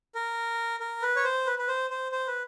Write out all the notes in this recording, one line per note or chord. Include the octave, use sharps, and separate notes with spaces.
A#4
A#4
B4
C#5
C5
B4
B4
C5
C5
C5
B4